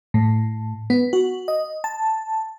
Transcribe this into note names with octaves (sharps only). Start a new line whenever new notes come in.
A2
B3
F#4
D#5
A5